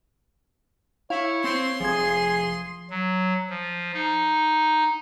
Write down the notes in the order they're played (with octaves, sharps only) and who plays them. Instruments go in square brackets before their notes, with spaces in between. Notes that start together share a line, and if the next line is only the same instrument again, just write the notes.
[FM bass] E4 [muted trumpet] C#5 [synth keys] F5
[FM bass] C4 [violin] C6
[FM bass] F1 [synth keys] F3 G#6 [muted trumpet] G#4
[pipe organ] F#3
F3
D#4